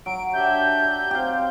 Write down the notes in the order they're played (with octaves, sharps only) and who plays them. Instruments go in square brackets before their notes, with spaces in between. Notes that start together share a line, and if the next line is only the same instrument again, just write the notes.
[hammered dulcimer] F#3 [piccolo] D7
[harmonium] D4 G4 E5 [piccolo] G6
[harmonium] C4 [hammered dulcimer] G4 F5